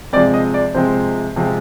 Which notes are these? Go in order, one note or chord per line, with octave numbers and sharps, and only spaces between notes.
C3 F3 G#3 C4 D5
D#5
D5
C3 F3 G#3 C4 C5
C3 F3 G#3 C4